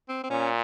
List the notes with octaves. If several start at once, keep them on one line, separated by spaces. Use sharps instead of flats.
C4
C4
A#2 C#4